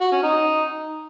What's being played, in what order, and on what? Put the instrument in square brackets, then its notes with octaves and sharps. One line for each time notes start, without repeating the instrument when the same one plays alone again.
[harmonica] F#4
C#4
D#4